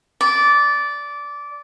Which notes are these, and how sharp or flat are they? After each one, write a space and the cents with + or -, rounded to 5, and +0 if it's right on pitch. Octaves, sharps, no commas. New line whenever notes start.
D5 -15